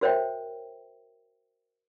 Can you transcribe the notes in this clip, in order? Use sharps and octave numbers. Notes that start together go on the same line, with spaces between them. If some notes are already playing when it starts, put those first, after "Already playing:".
F#4 A#4 C5 C#5 E5 G5